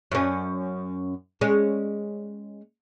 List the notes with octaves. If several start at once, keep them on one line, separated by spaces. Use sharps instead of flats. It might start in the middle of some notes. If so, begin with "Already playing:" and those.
F#2 C#4
G#3 C#4